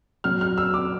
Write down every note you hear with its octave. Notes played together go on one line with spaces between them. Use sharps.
A#2 F#3 F6
F6
E6
D6